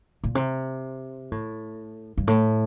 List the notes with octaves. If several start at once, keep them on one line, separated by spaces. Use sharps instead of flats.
A#2
C3
A2
G2
A2